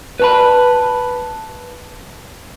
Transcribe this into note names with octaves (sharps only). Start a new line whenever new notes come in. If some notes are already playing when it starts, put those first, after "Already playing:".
B4 A5 B5